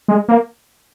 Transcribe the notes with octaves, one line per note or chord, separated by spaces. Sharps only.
G#3
A#3